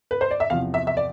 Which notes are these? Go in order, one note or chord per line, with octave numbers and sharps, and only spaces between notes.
B4
C5
D5
E5
E2 C3 F3 F5
E5
E5
D5